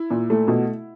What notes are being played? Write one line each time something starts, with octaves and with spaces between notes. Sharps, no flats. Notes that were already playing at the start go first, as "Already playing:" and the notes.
Already playing: E4
A#2
A3
B2